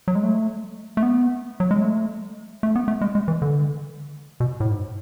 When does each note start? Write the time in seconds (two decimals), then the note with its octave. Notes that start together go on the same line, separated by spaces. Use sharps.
0.08 F#3
0.15 G#3
0.23 A3
0.97 A3
1.03 B3
1.60 F#3
1.71 G#3
1.82 A3
2.63 A3
2.76 B3
2.88 A3
3.01 G#3
3.15 G#3
3.28 E3
3.42 D3
4.40 B2
4.60 A2
4.70 G#2